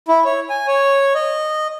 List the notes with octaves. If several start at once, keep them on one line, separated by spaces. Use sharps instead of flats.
E4
C#5
G#5
C#5
D#5